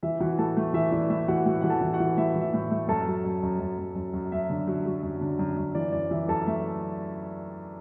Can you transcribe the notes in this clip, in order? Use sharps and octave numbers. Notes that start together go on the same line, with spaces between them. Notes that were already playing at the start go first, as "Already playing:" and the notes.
E3 E5
E3 F#4 F#5
A2 A4 A5
A3
E3 E5
E3 D5
A2 E5
E3 F#4 F#5
A2 F#4 F#5
E3 F#5
A4 A5
E3
F#4 F#5
E3
A2 E5
E3
E5
A2
E5
A3
F#2 A4 A5
F#3
F#2
F#2
F#2
F#2
F#2
F#2
F#2 E5
D3
F#3
F#3
F#2
D3
F#2
F#2
E3 D5
F#2 D5
E3 E5
F#2 A4 A5
A3 E5